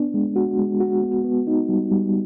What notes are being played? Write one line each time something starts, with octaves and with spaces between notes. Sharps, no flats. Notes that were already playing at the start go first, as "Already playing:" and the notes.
Already playing: B3 D4
G#3
F#4
G#3
F#4
B3
B3
D#4
G3
G3